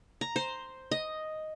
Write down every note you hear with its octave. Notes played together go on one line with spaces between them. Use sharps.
A#5
C5
D#5